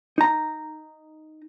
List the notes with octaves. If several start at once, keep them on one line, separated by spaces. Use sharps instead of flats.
D#4 A#5